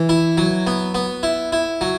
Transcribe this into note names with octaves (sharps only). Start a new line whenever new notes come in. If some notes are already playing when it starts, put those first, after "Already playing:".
Already playing: E3
E4
F#3
B3
B3
E4
E4
F#3